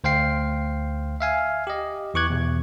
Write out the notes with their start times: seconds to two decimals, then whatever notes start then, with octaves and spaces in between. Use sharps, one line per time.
0.04 D2 C5 F5 G5 C7
1.20 E5 F5 G#5
1.67 G4 D#5
2.14 E2 E3 C#6 D6 F#6 G#6
2.30 E2 B2